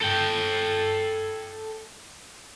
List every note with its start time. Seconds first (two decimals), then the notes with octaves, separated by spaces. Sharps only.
0.02 A4 G5